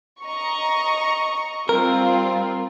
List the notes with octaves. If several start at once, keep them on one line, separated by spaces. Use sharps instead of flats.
D#5 A#5 C#6
G3 C4 F4 A#4